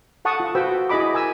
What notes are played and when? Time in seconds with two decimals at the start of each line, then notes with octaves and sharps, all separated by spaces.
0.25 A4 F#5 A5 C#6 D#6
0.40 F4
0.55 F#4 B4 C5 G5 B5 E6
0.89 E4 G#4 D#5 B5 D6
1.13 A#4 G#5 E6